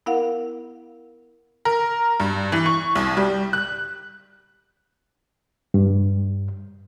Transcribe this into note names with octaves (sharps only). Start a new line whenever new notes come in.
B3 E4 A#4 F5 F#5
A#4
G2
E3
C#6
C2
G3
F#6
G2